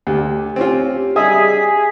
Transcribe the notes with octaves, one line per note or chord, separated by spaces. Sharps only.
D2 G4
C4 C#4 F4
G3 G#4 D#5 E5 B6